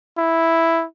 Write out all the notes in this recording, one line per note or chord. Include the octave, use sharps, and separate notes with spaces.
E4